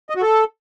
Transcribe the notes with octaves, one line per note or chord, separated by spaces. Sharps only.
D#5
F#4
A4